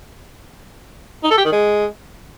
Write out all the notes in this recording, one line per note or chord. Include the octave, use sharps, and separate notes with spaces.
D#4
A4
G4
D#3
G#3